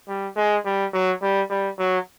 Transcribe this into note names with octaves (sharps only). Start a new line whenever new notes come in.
G3
G#3
G3
F#3
G3
G3
F#3